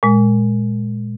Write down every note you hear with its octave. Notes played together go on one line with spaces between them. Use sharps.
A#2 G#3